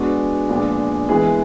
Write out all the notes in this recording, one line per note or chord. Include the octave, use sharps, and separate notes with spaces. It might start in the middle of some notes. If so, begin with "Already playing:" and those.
Already playing: G#3 B3 D4 F#4
A#2 F3 G#3 B3 D4
E3 G#3 B3 E4 G#4